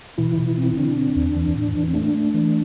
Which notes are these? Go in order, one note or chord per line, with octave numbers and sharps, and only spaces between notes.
B2 E3 E4
B2
C4
D3 D4
C4
E2
E3
A2
E3
C4
A3 D4
A3
E3